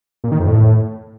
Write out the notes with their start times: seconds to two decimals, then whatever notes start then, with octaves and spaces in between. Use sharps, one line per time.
0.24 A#2
0.32 D#3
0.39 F2
0.47 A2